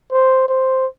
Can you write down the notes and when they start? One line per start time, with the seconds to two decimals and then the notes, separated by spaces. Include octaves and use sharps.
0.12 C5
0.48 C5